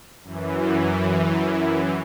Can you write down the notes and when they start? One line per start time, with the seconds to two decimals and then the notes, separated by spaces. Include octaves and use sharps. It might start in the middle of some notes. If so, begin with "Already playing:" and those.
0.23 F#2 E3